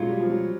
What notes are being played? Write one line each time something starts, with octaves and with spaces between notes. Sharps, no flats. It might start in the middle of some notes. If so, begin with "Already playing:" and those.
Already playing: B2 F#3 G#3 C#4 F4
G3
F3
F#3